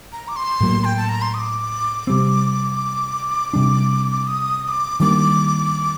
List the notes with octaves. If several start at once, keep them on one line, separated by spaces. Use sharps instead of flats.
A#5
D6
C6
A2 F#3 A#3
G5
A5
A#5
C6
D#6
D6
C3 G3 C4
C3 G3 D4
D#6
D#6
D6
D#3 G3 A#3 D4 D6